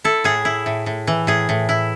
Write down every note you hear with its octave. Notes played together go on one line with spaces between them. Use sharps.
E4 A4
A2 G#4
E4
A2
A2
E3
A2 G#4
A2
E4